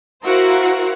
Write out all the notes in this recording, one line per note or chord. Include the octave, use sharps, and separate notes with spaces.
E4 F#4 A#4 C5 F5 F#5